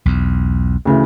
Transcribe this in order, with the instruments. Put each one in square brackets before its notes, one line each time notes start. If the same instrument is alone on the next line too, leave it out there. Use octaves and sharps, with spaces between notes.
[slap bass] B1 E2
[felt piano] D2 C#3 E3